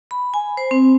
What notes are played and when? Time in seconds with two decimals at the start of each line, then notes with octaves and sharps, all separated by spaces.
0.11 B5
0.34 G#5
0.57 C5
0.71 C4